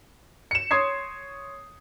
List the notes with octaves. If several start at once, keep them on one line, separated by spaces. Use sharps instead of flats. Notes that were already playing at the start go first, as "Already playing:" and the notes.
C#7 E7
C#5 C6 D#6 G#6 C7